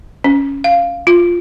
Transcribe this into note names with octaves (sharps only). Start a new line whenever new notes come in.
C#4
F5
F4